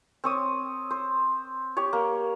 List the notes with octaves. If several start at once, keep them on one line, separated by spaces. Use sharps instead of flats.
C4 C#5 D#6
C5
G4 C#5
A#3